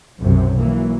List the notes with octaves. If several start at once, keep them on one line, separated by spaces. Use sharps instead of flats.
B1 F#2 C3 F#3
E3 F#3 A#3